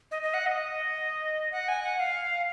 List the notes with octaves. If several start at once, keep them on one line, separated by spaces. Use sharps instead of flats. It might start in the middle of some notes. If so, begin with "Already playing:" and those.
D#5
D#5
F#5
D#5
F#5
G#5
F#5
F5